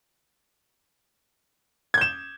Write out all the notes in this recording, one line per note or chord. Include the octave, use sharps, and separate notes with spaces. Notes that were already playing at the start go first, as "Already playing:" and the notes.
G6 G#6 E7